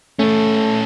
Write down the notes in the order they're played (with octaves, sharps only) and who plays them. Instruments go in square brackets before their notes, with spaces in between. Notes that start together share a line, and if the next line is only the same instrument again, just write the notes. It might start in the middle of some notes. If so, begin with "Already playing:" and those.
[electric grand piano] A3 [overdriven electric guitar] C#4 A4